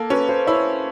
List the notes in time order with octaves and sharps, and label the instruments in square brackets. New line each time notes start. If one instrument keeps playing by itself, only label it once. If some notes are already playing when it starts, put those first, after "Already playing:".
Already playing: [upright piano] A#3 [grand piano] A4
[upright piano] C#4 [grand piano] B4
[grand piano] C5
[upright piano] E4 [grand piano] C#5